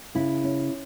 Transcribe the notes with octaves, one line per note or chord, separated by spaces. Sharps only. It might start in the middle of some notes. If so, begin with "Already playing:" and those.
C#3 E4
C#4